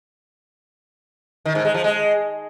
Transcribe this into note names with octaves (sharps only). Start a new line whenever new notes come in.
D#3
G#2
G#3
F3
G#3